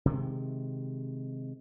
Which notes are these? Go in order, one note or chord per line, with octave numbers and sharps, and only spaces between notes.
C3 D#3 G#3